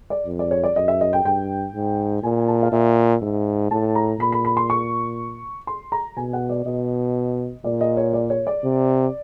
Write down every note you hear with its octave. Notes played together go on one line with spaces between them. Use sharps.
D5
F2
D5
C#5
D5
F#2 D#5
E5
D#5
G5
G2 G5
G#2
A#2 G#5
A5
F5
A#2 E5
G#2
A2 A5
A#5
A#2 B5
B5
B5
C6
C#6
C6
A#5
B2 G#5
F#5
D5
B2 D#5
A#2 D5
D#5
C#5
D5
C#5
D5
C3